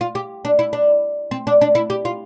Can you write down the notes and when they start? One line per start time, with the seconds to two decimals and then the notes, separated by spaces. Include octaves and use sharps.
0.01 F4
0.15 G4
0.45 D4
0.59 E4
0.73 D4
1.31 C4
1.47 D4
1.61 D4
1.75 E4
1.90 G4
2.05 F4